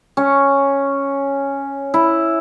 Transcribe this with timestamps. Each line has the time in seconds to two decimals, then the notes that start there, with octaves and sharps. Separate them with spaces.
0.17 C#4
1.94 E4